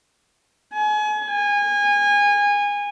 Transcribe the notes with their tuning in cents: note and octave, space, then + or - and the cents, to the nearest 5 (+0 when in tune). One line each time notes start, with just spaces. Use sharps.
G#5 +30
G#5 -25